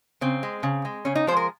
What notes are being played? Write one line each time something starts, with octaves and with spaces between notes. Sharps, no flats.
C#3 C4
G#3
C#3
G#3
C#3 C#4
D#4
F3 G#3 C5
A#4